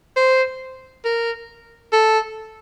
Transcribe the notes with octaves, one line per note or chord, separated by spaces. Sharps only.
C5
A#4
A4